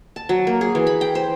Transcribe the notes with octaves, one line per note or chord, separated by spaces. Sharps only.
A5
F#3
A#3
G#4
E3
B5
G5
C5